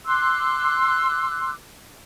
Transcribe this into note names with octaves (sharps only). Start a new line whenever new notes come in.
C6 D6 E6 F#6